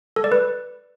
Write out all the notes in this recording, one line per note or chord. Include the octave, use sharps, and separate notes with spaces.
A4
D5
B4